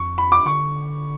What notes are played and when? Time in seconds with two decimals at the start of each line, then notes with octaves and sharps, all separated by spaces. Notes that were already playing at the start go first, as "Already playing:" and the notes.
Already playing: F2 C#6
0.18 B5
0.32 D6
0.46 D3 C#6